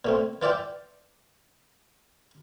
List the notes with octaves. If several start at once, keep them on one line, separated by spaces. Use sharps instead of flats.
A#2 A3 C4
E3 F4 D5 E5 G5